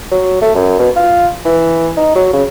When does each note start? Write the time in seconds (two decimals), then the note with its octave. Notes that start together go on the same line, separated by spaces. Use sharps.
0.11 F#3
0.42 A3
0.55 F#2
0.79 B2
0.96 F4
1.45 E3
1.97 D#4
2.16 F#3
2.33 C#3